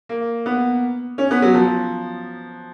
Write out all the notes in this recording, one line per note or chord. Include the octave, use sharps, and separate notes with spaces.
A#3
B3
C#4
B3
F#3
F3